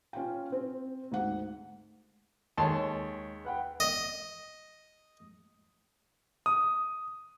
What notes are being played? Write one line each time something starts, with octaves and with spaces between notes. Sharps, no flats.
C#4 F4 G5
C4
D2 G#2 F#5
D#2 G#3 C#5 A5 C6
B4 F#5 G5
D#5
D#6